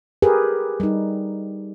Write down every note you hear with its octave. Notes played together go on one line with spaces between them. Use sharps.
G4 G#4 A#4 B4
G3 D#4